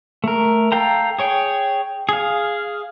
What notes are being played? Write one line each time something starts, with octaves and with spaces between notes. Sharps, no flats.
A3 A#4
A4 F5 G5 A#5
G#4 C#5 G5
G#4 F5